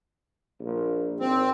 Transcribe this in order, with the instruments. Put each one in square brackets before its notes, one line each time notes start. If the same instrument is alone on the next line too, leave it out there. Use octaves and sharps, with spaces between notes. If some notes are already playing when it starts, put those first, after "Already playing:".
[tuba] A#1
[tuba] G#1 [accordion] C4